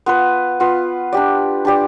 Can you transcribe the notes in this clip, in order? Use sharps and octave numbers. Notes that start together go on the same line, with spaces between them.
B3 F4 B4
B3 F4 B4
D4 G4 D5
D4 G4 D5